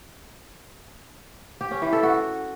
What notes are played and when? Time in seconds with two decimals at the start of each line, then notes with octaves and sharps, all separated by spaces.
1.61 G4
1.71 C#4
1.82 E3
1.93 A4
2.03 F#4